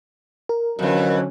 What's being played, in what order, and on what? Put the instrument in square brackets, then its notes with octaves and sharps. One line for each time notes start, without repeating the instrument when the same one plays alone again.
[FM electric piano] A#4
[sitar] F2 E3 [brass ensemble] D3 F#3 C#4